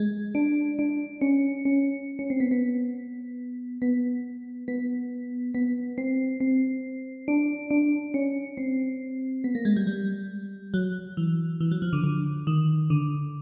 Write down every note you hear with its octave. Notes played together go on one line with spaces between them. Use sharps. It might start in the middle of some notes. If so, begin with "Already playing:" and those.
Already playing: G#3
D4
D4
C#4
C#4
C#4
C4
B3
B3
B3
B3
B3
C4
C4
D4
D4
C#4
C4
B3
A#3
G#3
G3
G3
F#3
E3
E3
F#3
F3
D3
D3
D#3
D3